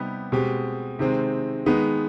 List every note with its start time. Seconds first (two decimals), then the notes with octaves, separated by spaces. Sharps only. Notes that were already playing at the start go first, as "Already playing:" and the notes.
Already playing: C3 G3 B3 D#4 G4
0.32 B2 G#3 C4 G4
0.99 C3 D#3 G#3 C4
1.66 D#3 G#3 B3 D#4